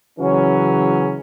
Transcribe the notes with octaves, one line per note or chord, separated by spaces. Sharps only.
C#3 E3 F#3 C#4